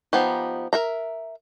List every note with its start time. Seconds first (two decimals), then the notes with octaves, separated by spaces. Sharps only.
0.13 F3 B3 D#4 G4
0.73 A#4 E5 A#5